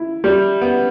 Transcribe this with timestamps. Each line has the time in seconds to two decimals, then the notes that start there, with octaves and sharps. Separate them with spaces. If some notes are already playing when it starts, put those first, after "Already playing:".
Already playing: E4
0.24 G3
0.62 B3